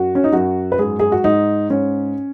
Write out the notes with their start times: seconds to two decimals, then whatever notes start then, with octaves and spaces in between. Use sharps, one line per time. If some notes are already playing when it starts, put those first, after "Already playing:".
Already playing: F#2 F#4
0.15 C#4
0.24 D#4
0.32 F#2 F#4
0.72 B4
0.79 G#2 G#4
0.99 G#4
1.12 F#4
1.24 G#2 D#4
1.70 G#2 C#4